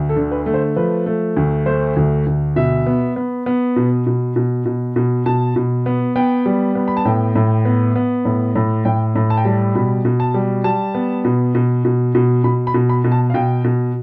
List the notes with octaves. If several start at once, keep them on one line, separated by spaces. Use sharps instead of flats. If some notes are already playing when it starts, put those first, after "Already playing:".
Already playing: D2
A4
D3
B4
A3
C5
F3 B4
A3
D2
A3 C5
D2
D2
B2 E5
B3
B3
B3
B2
B2
B2
B2
B2
B2 A5
B2
B3
B3 G5
G3
B3
B5
A5
A2 G5
A2
B3
B3
A2
A2
A2 G5
A2
A5
G5
G3 A5
B2 B5
B2
A5
G3
G3 A5
B3
B2
B2
B2
B2
B2 B5
B5
B2
B5
B2
A5
F5
B2 G5
B2